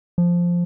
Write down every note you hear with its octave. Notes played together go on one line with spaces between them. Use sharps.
F3